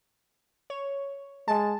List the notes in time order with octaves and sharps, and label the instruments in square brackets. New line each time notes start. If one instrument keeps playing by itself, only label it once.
[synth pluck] C#5
[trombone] G#3 [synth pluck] A5